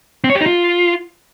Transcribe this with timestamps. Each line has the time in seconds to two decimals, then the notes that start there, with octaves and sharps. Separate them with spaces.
0.24 C4
0.30 C#5
0.35 G4
0.41 D#4
0.46 F4